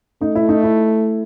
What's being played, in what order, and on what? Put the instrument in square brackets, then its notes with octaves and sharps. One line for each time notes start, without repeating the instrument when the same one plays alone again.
[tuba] A3 [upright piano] D#4
[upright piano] E4
D#4
E4